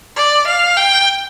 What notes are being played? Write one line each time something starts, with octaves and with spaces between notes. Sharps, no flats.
D5
F5
G5